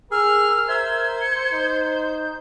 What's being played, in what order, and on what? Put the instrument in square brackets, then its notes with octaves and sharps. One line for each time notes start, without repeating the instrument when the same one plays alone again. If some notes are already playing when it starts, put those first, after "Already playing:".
[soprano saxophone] G#4 [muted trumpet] A#4 [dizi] E6 [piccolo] F6
[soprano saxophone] C5 [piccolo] E5 [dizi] G#6
[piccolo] C#7
[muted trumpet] D#4 [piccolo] G6